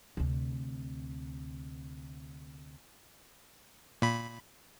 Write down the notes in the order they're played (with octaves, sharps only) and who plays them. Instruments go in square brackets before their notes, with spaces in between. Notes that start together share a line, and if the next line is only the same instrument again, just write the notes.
[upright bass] D2 C3
[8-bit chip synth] A#2 B5